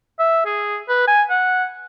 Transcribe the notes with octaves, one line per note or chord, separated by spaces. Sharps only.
E5
G#4
B4
G#5
F#5